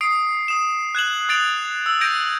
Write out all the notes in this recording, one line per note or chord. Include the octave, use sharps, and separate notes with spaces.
D#6 C7 D7
D#6 E7
F#6 G#6 E7 F#7
D#6 A6 D7 F7 F#7
E6
G6 G#6 A#6 D7 D#7